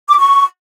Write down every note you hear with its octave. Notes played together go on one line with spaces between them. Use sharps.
D6
C#6